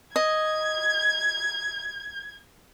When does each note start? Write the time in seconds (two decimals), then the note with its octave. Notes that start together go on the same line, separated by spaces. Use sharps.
0.16 D#5 G#6